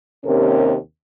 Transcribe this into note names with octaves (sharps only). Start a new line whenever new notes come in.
D#2 C3 C#4 A#4